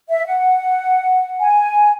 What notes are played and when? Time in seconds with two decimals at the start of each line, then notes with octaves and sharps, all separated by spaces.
0.08 E5
0.26 F#5
1.40 G#5